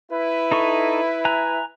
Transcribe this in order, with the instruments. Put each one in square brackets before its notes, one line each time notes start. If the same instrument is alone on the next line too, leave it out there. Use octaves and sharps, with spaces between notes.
[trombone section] E4 B4
[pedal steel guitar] D#4 A4 C#6
G#5 A#5 F#6